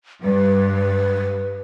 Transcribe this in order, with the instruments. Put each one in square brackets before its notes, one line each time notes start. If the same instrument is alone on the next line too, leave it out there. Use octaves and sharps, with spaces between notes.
[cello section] G2 [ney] B4